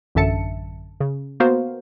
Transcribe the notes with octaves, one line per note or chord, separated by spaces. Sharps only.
A1 F#2 D3 E5 A5 C#7
C#3
A#3 B3 F#4 A#4 C5 F5